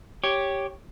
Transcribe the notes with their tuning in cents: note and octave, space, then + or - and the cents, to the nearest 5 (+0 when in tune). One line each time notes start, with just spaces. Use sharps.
G4 +0 C#5 +0